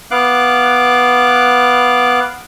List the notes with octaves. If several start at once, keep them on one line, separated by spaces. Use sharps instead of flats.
B3 F5 D6 F#6